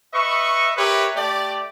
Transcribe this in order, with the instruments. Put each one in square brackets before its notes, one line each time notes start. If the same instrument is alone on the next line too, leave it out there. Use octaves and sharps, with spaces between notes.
[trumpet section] B4 D#5 E5 C#6
G4 A#4 B4 C#5 E5
A3 G4 D5